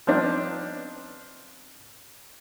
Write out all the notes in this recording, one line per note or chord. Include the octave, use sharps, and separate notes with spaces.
F3 B3 C4 D4 D#4